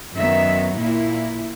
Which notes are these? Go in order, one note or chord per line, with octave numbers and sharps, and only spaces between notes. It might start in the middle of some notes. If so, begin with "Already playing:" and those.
F#2 D#3 F#3 B3 E5
A#2 A#3 E4